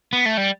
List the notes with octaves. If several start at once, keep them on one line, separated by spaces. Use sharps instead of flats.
B3
A3
G3